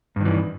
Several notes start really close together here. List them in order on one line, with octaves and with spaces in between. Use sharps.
G2 D#3 E3